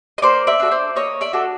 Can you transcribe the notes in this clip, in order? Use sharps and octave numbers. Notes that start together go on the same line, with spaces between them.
D#5
A#3 C5 D5
D5 E5
D4 F#4 A4
C5 D5
A#3 C#5 D#5
D5 E5
D4 F#4 A4